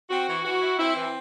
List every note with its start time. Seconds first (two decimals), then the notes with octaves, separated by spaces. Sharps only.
0.10 C4 F#4
0.28 E3
0.44 E3 F#4
0.61 E4
0.79 C4 E4
0.96 E3